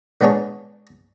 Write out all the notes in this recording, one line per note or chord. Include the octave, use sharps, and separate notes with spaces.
A#1 G#2 B3 D4 G#4 C#5